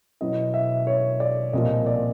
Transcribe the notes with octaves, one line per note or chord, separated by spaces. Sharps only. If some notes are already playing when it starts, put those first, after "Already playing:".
B2 F#3 B3 E4 D#5
E5
C#5
D5
C2 A#2 F3 D#5
D5